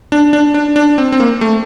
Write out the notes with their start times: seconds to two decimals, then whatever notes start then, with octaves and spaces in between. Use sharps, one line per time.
0.12 D4
0.33 D4
0.54 D4
0.76 D4
0.98 C4
1.12 C4
1.20 A#3
1.41 A3